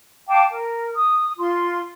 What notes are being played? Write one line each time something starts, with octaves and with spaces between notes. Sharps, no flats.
F5 G5 A5 D6
A#4
D#6
F4 C6